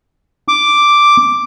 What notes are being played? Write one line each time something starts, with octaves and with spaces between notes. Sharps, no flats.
D6